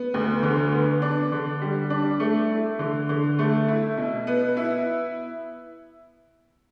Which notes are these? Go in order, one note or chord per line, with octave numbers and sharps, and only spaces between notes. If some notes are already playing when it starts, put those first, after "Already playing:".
Already playing: B3
D2
D3
B3
D4
D3
G3
D4
A3
E4
D3
D3
A3
E4
B2
B3
E4